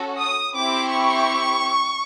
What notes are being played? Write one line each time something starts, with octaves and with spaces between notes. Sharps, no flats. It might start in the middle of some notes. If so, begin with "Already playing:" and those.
Already playing: C#4 F#4 A4
D#6
C4 E4 G4 D6
C#6